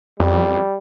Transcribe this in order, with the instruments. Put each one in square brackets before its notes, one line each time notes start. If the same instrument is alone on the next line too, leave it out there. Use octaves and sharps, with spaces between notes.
[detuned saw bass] F2 [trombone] G3